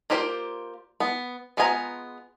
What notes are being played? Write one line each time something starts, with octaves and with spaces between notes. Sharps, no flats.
A#3 F4 G4 C5 D5
B3
G#3 B3 F4 G#5 A#5